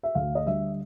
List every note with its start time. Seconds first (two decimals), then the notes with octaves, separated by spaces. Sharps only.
0.03 E5
0.15 D2 F5
0.35 D#5
0.46 D3 G3 E5